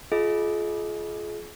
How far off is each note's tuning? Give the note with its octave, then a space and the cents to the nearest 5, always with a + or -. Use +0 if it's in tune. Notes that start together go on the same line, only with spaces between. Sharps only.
F4 +0 G#4 +35 D#5 +20